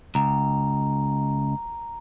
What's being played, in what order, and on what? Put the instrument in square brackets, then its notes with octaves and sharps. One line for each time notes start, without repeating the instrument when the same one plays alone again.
[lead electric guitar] C#2 [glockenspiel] A#5